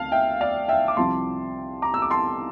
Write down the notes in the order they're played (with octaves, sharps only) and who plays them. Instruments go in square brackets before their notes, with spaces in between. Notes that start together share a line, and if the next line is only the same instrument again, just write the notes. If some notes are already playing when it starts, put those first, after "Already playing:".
Already playing: [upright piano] D2 C4 F5 A5
E5 G5
D5 F5
E5 G5
D6
C2 C3 F3 C4 A5 C6
A#5 D6
E6
D6
A5 C6